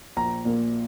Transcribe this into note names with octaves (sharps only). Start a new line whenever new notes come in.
A#1 A#5
A#2 A#3